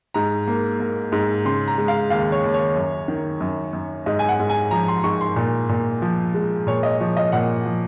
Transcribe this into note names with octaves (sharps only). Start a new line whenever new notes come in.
G#2 A#5
A#3
A#3
G#2
C#3 C6
A#5
G#3
F5
D#2 F5
C#5
D#2
C#5
F#2
D#3
F#2
F#2
G#2 D#5
G#5
F#5
G#2
G#5
F3 A#5
C6
G#2 C#6
C6
A#2
A#2
F3
G#3
A#2 C#5
D#5
F3 C#5
D#5
A#2 F#5
F3